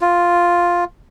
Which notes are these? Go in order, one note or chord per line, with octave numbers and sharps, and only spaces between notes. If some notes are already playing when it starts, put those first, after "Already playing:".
F4